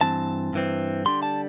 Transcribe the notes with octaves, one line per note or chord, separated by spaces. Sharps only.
G2 E3 C4 A5
G2 E3 C4
D3 G3 D4 C6
A5